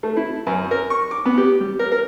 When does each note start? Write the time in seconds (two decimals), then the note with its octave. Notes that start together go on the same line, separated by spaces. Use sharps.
0.03 A3
0.17 E4
0.47 F#2
0.71 A#4
0.90 C#6
1.11 D6
1.25 B3
1.38 G4
1.60 G3
1.79 A#4
1.92 A#4